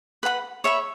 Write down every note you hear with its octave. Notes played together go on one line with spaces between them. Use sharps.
B4 F#5 B5
C#5 E5 B5